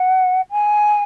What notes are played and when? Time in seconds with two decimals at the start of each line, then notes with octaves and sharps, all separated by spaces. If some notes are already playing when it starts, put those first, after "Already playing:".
Already playing: F#5
0.51 G#5